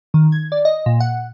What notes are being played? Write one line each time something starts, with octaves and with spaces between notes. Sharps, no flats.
D#3
G#6
D5
D#5
A#2
F#5